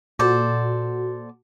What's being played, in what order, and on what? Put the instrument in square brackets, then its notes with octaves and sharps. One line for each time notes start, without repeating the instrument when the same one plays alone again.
[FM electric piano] A#2 F#4 [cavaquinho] A4 C5 D5